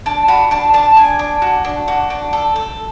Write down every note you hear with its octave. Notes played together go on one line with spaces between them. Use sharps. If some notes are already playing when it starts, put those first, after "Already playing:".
D4 A5
F#4 B5
D4 A5
D4 A5
D4 G#5
D4
F#4
D4
F#4
D4
A4
A4